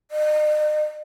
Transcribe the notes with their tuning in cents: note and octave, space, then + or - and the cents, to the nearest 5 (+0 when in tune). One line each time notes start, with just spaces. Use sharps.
D#5 -40